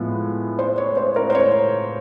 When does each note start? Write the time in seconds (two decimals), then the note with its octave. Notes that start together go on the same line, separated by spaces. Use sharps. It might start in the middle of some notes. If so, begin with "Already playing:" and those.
Already playing: A2 F3 G#3 B3
0.59 C5
0.78 C#5
0.97 C5
1.16 A#4
1.30 C5
1.35 C#5